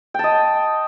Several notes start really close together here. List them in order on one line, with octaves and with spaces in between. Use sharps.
G5 A5 D#5